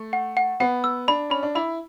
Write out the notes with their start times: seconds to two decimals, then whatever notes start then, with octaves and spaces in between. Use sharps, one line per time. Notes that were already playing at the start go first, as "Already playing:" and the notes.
Already playing: A3
0.13 F#5
0.37 F#5
0.60 B3 F#5
0.84 E6
1.08 D4 B5
1.30 C#4 B5
1.43 D4
1.55 E4 B5